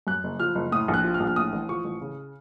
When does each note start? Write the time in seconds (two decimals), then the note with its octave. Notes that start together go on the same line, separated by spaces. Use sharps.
0.07 F#2 F#6
0.24 F#1
0.40 F3 F6
0.55 F#1
0.72 A2 D#6
0.88 A#1
0.94 F#6
1.04 F3
1.14 F6
1.20 A#1
1.27 F6
1.36 A2 D#6
1.53 A1
1.69 F3 C#6
1.85 A1
2.01 C#3